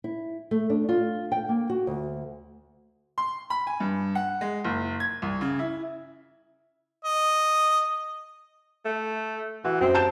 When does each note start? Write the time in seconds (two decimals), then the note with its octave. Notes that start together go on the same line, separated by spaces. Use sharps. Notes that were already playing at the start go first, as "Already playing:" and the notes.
0.04 E4
0.51 A3
0.70 D4
0.89 F4
1.32 G5
1.49 A#3
1.70 F#4
1.87 D2
3.18 C6
3.50 B5
3.67 G#5
3.80 G2
4.15 F#5
4.41 G#3
4.64 F#1
5.00 G#6
5.22 C2
5.41 C#3
5.59 E4
7.05 D#5
8.85 A3
9.65 E3 F#4
9.81 F#2 C4
9.95 A5 G6 E7